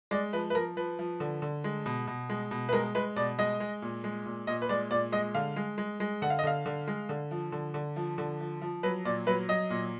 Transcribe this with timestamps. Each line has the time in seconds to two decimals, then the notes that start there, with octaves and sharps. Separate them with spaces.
0.11 G#3 D5
0.33 F3 B4
0.50 B4
0.55 F3 A#4
0.77 F3 B4
0.99 F3
1.20 D3
1.42 D3
1.64 G#3
1.86 B2
2.07 B2
2.29 G#3
2.51 B2
2.69 B4
2.73 G#3 A#4
2.95 G#3 B4
3.16 B2 D5
3.38 G#3 D#5
3.60 G#3
3.82 A#2
4.04 G#3
4.26 A#2
4.47 A#2 D#5
4.62 B4
4.69 G#3 D5
4.91 A#2 D5
5.12 G#3 D#5
5.34 D3 F5
5.56 G#3
5.78 G#3
6.00 G#3
6.22 D3 F#5
6.30 F5
6.39 D#5
6.44 D3 F5
6.66 D3
6.87 G#3
7.09 D3
7.31 F3
7.52 D3
7.74 D3
7.96 F3
8.18 D3
8.40 F3
8.61 F3
8.83 F#3 B4
9.05 A#2 D5
9.27 F#3 B4
9.49 F#3 D#5
9.70 A#2